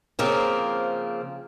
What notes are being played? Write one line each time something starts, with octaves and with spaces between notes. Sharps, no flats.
C#3 F3 A#3 C4